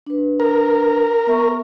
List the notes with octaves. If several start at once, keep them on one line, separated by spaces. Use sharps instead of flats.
D4 B4
A#4
B3 E5 C#6